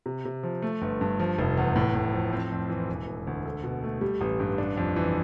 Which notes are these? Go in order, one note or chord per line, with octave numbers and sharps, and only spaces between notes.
C3
C3
F3
A3
G1
G2
F3
F1
E2
A2
A2
F3
C4
F2
E3
E1
E1
D2
A4
B2
A3
G3
A1
G2
D4
F2
E3